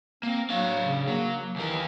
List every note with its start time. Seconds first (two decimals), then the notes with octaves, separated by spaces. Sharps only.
0.23 A#3 C4
0.50 F#3 D4 F5
0.84 C#3
1.08 F#3 A#3
1.56 D#2 E3 A#4